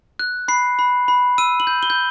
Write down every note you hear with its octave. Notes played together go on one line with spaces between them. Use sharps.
F#6
B5 C7
B5
B5
E6 D#7
F#7
G6
G7
G6